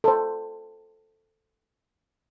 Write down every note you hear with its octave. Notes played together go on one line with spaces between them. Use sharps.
A4 C5